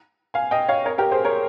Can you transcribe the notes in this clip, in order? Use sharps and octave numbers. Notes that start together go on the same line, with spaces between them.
F5 G#5
D#5 G5
C#5 F5
A#4 C#5
G4 A#4
G#4 C5
A#4 C#5